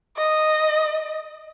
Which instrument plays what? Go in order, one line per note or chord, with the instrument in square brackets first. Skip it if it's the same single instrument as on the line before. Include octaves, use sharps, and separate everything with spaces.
[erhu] D#5